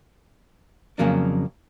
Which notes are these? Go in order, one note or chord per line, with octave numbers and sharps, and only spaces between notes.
F2 C#3 F#3 A#3 D4